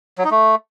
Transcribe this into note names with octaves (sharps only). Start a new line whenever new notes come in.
F#3
D#4
A3